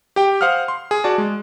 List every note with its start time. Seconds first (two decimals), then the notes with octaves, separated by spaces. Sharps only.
0.16 G4 G5
0.41 C5 F5 F#5 D#6 F6
0.68 C6
0.91 G#4
1.04 F#4 D5 A5
1.18 G#3